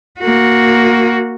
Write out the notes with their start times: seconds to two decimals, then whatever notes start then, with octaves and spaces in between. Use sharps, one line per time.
0.19 A#3 F#4